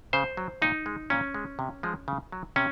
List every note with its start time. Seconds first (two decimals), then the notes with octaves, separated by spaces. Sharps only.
0.13 C#3 C5
0.37 F#3
0.62 A#2 D#4
0.86 G#3
1.10 A#2 C#4
1.34 G#3
1.59 C3
1.83 F3 G#3
2.08 C#3
2.32 F#3
2.56 C3 C#4